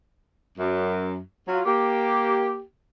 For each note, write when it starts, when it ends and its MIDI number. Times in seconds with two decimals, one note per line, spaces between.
0.59 1.18 42
1.48 1.60 54
1.48 1.60 65
1.65 2.61 58
1.65 2.61 67